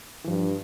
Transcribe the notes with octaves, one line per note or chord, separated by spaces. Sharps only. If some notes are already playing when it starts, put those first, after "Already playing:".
E3
G2 F3